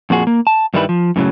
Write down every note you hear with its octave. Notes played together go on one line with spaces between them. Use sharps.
F2 A#2 F#4 G#4
A#3
A5
G2 D#3 G3 E4 B4
F3
F#2 A2 C#3 F#3